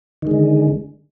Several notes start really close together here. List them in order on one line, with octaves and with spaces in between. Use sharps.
D#3 G#3 D3